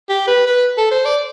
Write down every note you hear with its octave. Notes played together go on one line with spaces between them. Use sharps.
G4
B4
B4
A4
C5
D5